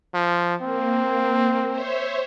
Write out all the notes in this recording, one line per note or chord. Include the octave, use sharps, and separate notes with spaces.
F3
A#3 C4
C5 C#5 E5